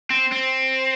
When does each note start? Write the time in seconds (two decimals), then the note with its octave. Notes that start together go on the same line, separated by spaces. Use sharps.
0.10 C4
0.32 C4